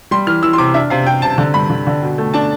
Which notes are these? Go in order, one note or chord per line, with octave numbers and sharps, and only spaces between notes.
G3 C6
E3 F6
E3 E6
C6
C3 D6
D4 E5
C3 F5
C3 G5
C3 A5
D3
G2 B5
D3
D3
B2
A3
D4 A5